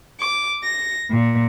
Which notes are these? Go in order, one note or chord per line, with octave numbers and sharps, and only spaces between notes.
D6
A#6
A#2